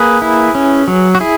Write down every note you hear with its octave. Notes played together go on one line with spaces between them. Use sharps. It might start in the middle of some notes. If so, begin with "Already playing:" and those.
Already playing: A#3 G#4 B4
E4
C#4
F#3
F#4
E4 G#4